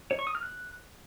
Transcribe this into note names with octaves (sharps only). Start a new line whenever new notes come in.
C#5
C#6
D#6
F6
F#6